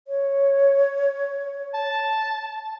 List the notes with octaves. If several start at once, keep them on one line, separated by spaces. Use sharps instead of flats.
C#5
A5